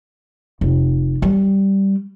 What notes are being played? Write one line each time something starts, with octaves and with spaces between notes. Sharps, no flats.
F1
G3